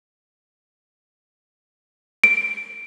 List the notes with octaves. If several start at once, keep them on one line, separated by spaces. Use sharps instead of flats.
D7